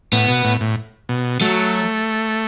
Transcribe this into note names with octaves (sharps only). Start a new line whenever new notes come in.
A2 B3
B2
A2
A2
B2
F#3 A3